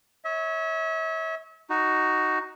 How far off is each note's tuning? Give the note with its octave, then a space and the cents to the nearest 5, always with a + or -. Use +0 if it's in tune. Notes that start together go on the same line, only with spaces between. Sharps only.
C#5 +0 E5 -35
D#4 +0 F#4 +10